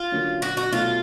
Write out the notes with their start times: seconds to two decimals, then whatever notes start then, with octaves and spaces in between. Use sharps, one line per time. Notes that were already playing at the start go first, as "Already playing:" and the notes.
Already playing: F4
0.12 D3 F#3 A#3 C#4
0.42 F#4
0.57 F#4
0.72 B2 F#3 A3 F4